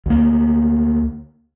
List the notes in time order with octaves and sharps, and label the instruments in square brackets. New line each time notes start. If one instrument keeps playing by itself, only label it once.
[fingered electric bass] D2 A#3